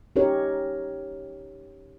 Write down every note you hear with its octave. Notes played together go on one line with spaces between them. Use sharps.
C#4 D#4 G4 A#4 C#5